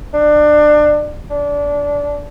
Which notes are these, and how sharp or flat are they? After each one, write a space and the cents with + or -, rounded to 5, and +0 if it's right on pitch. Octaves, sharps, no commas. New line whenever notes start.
D4 +25
D4 -20